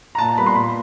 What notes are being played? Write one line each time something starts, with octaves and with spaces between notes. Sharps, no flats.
A#5
A#2 A5
A#5
G3 B3 B5
C6
A#2 B5